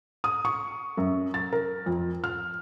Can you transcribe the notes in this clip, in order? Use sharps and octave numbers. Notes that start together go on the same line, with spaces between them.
D#6
C#6
F#2
A6
A#4
F2
F6